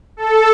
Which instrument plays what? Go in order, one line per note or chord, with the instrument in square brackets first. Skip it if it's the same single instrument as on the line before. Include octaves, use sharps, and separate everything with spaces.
[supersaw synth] A4